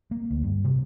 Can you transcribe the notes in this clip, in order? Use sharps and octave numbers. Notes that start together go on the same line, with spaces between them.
A#3
D2
G2
C3